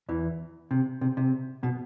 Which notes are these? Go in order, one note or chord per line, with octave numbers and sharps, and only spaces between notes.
E2 E3
C3
C3
C3
B2